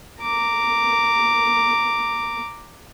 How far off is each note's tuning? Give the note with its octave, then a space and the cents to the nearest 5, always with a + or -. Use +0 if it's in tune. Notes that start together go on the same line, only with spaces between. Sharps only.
A#5 -10 D6 +0